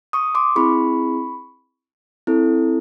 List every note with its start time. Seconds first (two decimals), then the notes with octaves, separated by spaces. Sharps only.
0.13 C#6 D#6
0.35 C6 D6
0.56 C4 E4 G#4 B5 C#6
2.27 C4 E4 A4